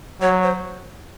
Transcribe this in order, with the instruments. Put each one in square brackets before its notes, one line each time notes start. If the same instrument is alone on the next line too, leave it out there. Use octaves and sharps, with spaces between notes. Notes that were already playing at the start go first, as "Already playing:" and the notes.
[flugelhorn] F#3 [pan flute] C#5
[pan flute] C5